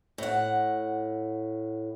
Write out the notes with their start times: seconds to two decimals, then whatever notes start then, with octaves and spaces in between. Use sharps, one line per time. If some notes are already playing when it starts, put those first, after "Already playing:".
0.18 A2 F#5